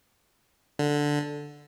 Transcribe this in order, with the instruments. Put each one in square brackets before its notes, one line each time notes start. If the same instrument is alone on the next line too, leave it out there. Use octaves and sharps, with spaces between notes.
[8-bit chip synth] D3